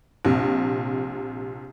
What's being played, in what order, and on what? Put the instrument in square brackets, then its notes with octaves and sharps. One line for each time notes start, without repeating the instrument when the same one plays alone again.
[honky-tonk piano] A#1 C3